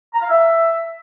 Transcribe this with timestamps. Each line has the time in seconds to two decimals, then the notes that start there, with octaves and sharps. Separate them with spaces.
0.13 A#5
0.21 F5
0.30 E5